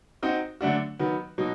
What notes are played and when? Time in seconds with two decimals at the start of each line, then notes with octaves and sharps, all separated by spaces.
0.22 C4 D#4 F#4
0.61 D3 F#3 A3 D4 F#4
0.99 D#3 F#3 B3
1.38 B2 F#3 D#4